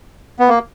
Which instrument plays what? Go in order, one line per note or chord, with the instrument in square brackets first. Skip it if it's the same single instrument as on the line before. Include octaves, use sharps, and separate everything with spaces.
[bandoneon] B3
A#3